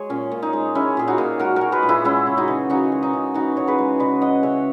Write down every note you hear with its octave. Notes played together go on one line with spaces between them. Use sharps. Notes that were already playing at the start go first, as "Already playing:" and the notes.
Already playing: G#3 G#4 C#5
A#2 C#4
A#2
D#4
G#3
G#3 C#4 E4
A#2 G#4
D#4 F#4
A#2
G#3 F#4 A#4
G#3 F#4 A#4
G#4 B4
A#2
E4 G#4
G#3 C#4 E4
C#3
D#4 F#4
E3
C#3 D#4 F#4
G#3
D#4
C#3
E3 D#4 F#4
C#3 C#5
G#4 B4
G#3
C#3 B4 D#5
E3 D#5 F#5
C#3 C#5 E5